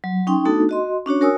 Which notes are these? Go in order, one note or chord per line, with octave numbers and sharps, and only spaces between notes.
F#3
C#4 D#4 G5 C6
A3 B3 D4 D#4 F#4 A4
F#4 D#5 C6
C#4 D4 F#4 C#5
F#4 A#4 C#5 G#5 D#6 E6